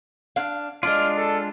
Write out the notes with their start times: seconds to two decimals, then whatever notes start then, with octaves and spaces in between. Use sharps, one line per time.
0.36 D4 F5
0.83 G#3 D4 F4 D5 D#5 F6
1.17 A4